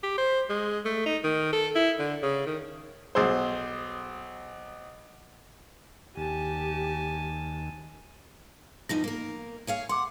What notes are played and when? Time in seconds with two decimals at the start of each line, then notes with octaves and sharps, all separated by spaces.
0.03 G4
0.18 C5
0.50 G#3
0.85 A3
1.06 D#4
1.24 D#3
1.53 A4
1.76 E4
1.99 D3
2.23 C#3
2.47 D#3
3.15 B1 G#4 C5
6.17 D#2 G4 G#5 A5
8.89 E2 F3 D#4 A#6
9.04 A#3 A#4
9.67 G#4 C#5 F5
9.89 F#5 C6 D6